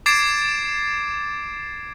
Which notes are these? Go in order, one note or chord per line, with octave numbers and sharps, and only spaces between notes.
D6 G#6 A6 C7 D7 E7